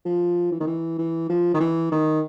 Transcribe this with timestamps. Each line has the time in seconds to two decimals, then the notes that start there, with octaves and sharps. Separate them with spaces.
0.05 F3
0.51 E3
0.60 D#3
0.67 E3
0.98 E3
1.29 F3
1.54 D#3
1.60 E3
1.92 D#3